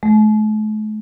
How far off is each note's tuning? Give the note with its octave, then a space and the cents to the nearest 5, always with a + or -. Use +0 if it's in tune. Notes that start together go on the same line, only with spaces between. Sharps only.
A3 -45